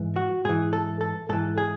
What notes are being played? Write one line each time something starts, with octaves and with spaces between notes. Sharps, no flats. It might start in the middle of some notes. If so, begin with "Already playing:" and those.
Already playing: G#2 E3
F#4
G#2 E3 G#4
A4
A4
G#2 E3 A4
G#4